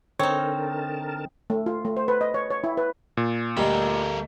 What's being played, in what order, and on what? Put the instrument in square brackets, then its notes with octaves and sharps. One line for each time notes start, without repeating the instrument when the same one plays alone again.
[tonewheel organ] D3 A#4 A5 [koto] C4 D#4 [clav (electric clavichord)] C#5
[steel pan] A3
F4
A3
C5
B4
D#5
C#5
C#5
E4
B4
[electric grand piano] A#2
[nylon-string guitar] D2 D#5 [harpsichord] G3 [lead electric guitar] A3 A#4